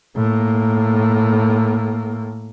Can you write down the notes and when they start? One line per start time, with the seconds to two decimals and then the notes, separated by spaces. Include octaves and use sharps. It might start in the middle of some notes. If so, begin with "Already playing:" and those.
0.17 A2 A#3